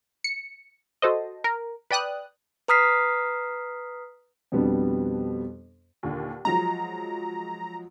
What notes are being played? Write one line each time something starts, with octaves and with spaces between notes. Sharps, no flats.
C#7
F#4 A4 C5 D#5
A#4
B4 D5 G5 D#6 F#6
B4 A#5 D#6 F6 B6 C7
F2 B2 G3 B3 D4
D#2 A#2 D3
F3 F#3 G#3 A#5